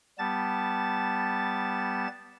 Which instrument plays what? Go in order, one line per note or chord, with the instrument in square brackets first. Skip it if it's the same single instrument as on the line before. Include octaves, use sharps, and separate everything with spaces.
[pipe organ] G3 B3 A5 A6